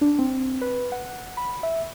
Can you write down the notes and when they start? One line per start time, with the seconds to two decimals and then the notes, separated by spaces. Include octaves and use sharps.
0.01 D4
0.19 C4
0.61 B4
0.92 F#5
1.37 B5
1.63 E5